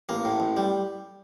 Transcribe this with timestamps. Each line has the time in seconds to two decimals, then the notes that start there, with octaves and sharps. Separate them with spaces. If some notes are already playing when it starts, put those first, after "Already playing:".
0.09 A1 A#3
0.25 A2
0.40 A1
0.57 G3